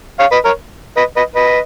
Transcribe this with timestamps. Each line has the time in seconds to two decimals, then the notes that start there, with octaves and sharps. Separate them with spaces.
0.19 C#5 F5
0.32 B4 D#5
0.45 A#4 C#5
0.97 B4 D#5
1.16 B4 D#5
1.35 B4 D#5